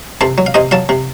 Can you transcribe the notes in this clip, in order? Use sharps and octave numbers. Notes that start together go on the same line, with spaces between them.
C3 A4 C5
F#3
F5
C3 C5 D#5
F#3 F5 A5
C3